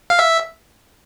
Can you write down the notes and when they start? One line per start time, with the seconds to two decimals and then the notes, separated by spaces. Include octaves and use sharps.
0.10 F5
0.19 E5